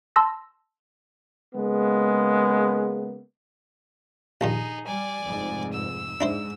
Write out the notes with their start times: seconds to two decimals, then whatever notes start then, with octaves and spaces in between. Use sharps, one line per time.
0.16 A5 C6 E6 A#6
1.55 C#3 G#3 A#3 B3
4.41 A#1 G2 D#3 D#4 G#4
4.86 G3 D5 G#5
5.24 F1 G#2
5.73 E6
6.21 G#2 D4 E4 C5